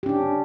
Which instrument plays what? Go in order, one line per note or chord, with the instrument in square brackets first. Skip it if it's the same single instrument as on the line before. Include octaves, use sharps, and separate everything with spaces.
[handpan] G4
C#4
D4